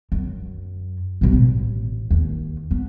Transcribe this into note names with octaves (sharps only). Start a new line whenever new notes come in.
F#2
B2 F#3
A1
D#2
B3